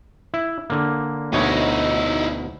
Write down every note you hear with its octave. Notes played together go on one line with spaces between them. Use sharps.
E4
D3 A#3
D2 B2 D#4 E4 C#5